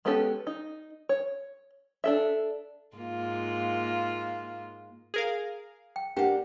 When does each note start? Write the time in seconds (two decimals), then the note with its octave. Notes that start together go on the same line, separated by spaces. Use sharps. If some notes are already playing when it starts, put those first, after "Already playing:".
0.05 G#3 B3 C#4 G4 A4
0.47 D#4
1.09 C#5
2.04 D4 A4 E5
2.97 G#2 A#3 F4
5.14 G#4 A#4 F5
5.96 G5
6.17 A#3 D4 G4 F#5 G5